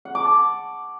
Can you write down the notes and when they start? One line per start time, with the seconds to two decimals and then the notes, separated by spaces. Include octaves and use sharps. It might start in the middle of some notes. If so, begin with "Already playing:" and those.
0.05 F#5
0.15 D6
0.25 A5